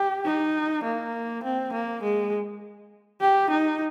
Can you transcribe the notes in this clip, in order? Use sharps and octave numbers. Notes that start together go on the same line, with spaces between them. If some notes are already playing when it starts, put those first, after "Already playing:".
Already playing: G4
D#4
A#3
C4
A#3
G#3
G4
D#4